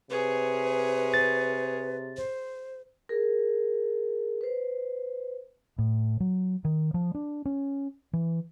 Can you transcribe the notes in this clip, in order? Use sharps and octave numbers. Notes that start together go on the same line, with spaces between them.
C3 G#4 B4 C#5
A6
C5
G#4 A#4
B4 C5
A2
F#3
D#3
F3
D4
C#4
E3